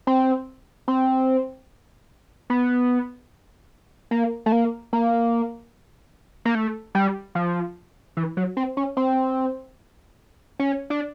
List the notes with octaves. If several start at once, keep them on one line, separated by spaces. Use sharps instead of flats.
C4
C4
B3
A#3
A3
A#3
A#3
A#3
A3
G3
F3
E3
F#3
C4
C#4
C4
C#4
D4